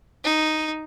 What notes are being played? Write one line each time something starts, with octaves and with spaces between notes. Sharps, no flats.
D#4